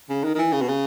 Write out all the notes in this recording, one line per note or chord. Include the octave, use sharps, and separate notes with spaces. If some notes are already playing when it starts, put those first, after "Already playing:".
C#3
D#3
D#3
E3
C#3
B2
C#3